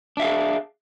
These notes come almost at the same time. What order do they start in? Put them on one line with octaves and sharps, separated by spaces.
D4 E5 F5 G#4